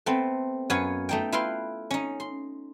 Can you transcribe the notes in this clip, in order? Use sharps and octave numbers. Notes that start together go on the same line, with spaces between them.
A3 B3 C4
F#2 B3 C#5 F5 G#5
A3 D#4 G5
E4 F4 B4 F5 G5 C6
C#4 D#4
C6